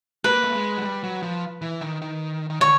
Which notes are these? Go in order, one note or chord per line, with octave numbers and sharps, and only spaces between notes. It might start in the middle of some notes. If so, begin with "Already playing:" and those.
A#3 B4
A3
G#3
F#3
G3
F#3
F3
E3
D#3
D#3
D#3
D3 C#5